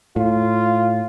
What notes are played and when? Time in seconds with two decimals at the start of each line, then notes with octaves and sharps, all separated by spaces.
0.16 A2 F4